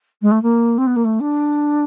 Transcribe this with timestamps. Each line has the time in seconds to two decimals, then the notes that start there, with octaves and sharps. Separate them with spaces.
0.21 G#3
0.31 A3
0.42 A#3
0.77 C4
0.86 B3
0.96 A#3
1.04 A3
1.20 D4